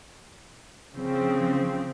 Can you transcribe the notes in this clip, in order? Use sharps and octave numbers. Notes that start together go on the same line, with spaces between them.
C#3 F3 C4